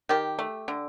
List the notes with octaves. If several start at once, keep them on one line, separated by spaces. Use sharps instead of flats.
D#3 G4
A3
D3